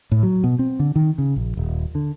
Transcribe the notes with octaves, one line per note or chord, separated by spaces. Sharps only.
A2
F#3
B2
C4
D3
D#3
C#3
A#1
D#1
D3